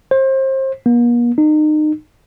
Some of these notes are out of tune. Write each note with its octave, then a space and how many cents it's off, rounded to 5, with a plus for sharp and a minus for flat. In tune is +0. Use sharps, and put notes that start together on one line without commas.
C5 +30
A#3 +45
D#4 -30